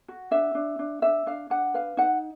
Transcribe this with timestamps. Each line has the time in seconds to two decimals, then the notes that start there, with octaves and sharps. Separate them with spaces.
0.08 F#4
0.31 D4 E5
0.55 D4
0.79 D4
1.02 D4 E5
1.26 D4 F5
1.50 D4 F#5
1.74 B4 F5
1.97 D#4 F#5